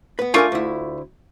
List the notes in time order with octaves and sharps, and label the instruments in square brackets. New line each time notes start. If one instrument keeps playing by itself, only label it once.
[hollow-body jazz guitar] B3 B4
[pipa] A3 F4 C#6 [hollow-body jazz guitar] D4 A#4 G#5
[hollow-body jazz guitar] D2 E4